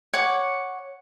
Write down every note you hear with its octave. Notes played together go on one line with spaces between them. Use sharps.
C#5 F#5 D6